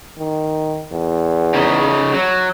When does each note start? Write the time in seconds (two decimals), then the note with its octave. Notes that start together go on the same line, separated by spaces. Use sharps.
0.18 D#3
0.92 E2
1.54 C#3 D#4
2.14 F#3